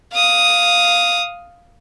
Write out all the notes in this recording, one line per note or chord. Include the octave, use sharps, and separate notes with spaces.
F5 D#6